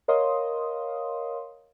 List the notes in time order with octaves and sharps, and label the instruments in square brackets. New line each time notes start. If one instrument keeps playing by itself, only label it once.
[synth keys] A#4 C#5 D#5 F5 C6 D#6